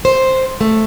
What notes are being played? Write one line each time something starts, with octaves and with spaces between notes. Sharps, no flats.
C5
A3